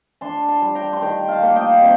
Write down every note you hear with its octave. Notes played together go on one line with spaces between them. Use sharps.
D4 A5 C6
A5 C6
G3
G5 A#5
C6
D#3 G5 A#5
F5 A5
A#3
D#5 G5
C3